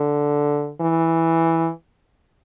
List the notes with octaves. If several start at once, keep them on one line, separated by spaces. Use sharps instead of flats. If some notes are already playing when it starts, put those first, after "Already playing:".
Already playing: D3
E3